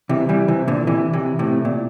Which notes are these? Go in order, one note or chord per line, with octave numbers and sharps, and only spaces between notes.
C3 E3
E3 G3
C3 E3
A#2 D3
C3 E3
C3 E3
A2 C3
A#2